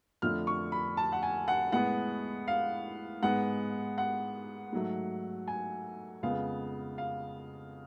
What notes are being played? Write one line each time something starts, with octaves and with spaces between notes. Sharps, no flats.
F2 D3 F3 A3 F6
C#6
B5
A5
F#5
G#5
F#5
A2 G#3 B3 F#5
F5
G#2 G#3 B3 F#5
F#5
G#2 F#3 A3
G#5
F2 C#3 G#3 B3 F5
F5